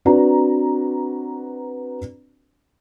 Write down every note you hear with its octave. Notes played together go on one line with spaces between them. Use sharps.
C4 D4 F#4 B4 D5 A#5